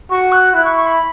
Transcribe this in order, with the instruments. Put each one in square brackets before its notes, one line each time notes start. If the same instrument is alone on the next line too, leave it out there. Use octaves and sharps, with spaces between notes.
[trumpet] F#4 [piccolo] C#6
[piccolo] F#6
[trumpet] E4 [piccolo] F#6
[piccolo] C#6
C#6
B5